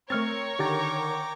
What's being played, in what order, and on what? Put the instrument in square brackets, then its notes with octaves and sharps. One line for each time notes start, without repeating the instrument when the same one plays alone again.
[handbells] A3 F6 A6 [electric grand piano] C4 [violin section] A#4 C#5 C#6
[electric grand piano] D3 D#3 [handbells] G4 A6 [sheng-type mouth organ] G5 A#5 D6